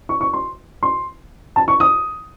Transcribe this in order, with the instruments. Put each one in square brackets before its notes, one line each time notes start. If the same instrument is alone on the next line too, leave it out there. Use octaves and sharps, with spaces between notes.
[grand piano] C#6
C#6
C6
C6
A5
C#6
D#6